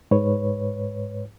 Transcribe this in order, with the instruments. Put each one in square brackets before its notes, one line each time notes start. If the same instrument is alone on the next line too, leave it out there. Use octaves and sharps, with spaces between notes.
[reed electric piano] G#2 B4 C#5